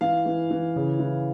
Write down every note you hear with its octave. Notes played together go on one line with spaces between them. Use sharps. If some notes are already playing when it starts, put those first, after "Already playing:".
E3 F5
E3
E3
C#3
E3